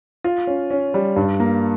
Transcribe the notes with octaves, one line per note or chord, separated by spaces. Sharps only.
F4
C#4
C#4
G3
G2
A#3